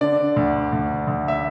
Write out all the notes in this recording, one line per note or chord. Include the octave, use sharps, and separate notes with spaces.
D3 D5
D2
D2
D2
E5